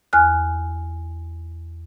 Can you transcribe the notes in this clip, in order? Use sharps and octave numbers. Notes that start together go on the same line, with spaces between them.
E2 G#5 F6 F#6